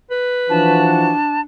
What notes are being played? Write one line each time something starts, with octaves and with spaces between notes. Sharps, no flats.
B4
E3 F3 D4 F#4 A5